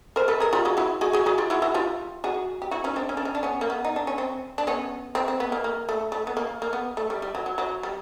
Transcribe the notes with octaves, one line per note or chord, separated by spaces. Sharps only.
A#4 C5
A4 B4
G#4 A#4
F4 G4
F#4 G#4
E4 F#4
F#4 G#4
F#4 G#4
F#4 G#4
F4 G4
E4 F#4
E4 F#4
F4 G4
F#4 G#4
G4
E4 F#4
C#4 D#4
C4 D4
C#4
D4
C#4
D4
B3 C#4
A#3
B3
D#4
D4
C#4
C4
D4
B3 C#4
C4
C4
B3
A#3
A#3
A3
A3
B3
A#3
A#3
B3
A3
G3
G3
F#3
F#3
F#3
G3